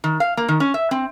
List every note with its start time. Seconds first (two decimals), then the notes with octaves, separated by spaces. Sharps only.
0.04 D#3
0.20 F5
0.37 A#3
0.49 D#3
0.60 C#4
0.74 E5
0.91 C4